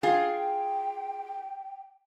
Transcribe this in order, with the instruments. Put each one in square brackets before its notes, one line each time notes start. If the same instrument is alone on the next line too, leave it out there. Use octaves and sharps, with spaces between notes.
[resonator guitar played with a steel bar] F4 G#4 [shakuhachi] G5